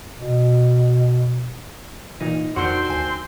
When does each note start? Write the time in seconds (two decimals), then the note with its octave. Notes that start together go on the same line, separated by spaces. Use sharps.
0.18 B2
2.21 A#2 E3 D#4
2.56 F2 D#3 C4 D4 F#4 C5 C6
2.90 D2 G#5